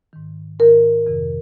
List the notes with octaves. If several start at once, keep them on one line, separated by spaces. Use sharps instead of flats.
G#2 D#3
G#2 D#3 A#4
F2 C3 D#3